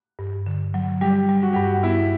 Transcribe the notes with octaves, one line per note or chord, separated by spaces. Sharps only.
G2
D3
F#3
G3 G4
G3
F#4
G2 G4
F#4
B3 E4